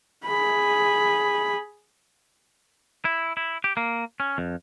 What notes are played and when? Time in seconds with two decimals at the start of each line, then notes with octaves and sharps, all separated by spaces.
0.26 G#4 B5
3.05 E4
3.37 E4
3.64 G4
3.77 A#3
4.20 C#4
4.38 F2